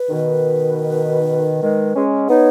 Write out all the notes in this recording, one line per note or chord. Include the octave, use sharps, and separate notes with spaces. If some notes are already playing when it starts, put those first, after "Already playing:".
Already playing: B4
B2 D#3
D#3 G#3
G#3 C#4
B3 D#4 C#5